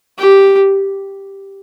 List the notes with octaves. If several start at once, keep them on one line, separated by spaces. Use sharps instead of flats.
G4